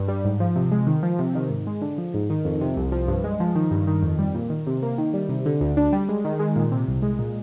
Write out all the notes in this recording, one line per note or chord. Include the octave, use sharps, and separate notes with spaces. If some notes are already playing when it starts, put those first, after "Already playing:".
Already playing: G2
G3
G#2
F3
C3
G#3
D#3
F3
C3
D#3
G#2
G#3
D3
F3
G#2
D#3
F2
C3
C2
F3
G2
G#3
F3
D#3
G2
D#3
F2
G3
A#2
D#3
C3
A#3
D#3
G3
C3
D3
D2
D4
G3
G#3
D#3
G#3
A#2
C3
C2
G#3
A#2